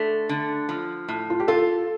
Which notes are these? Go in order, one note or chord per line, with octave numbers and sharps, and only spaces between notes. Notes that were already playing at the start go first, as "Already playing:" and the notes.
Already playing: D3 A3
D3
F3
A2
F4
G4
F4 A4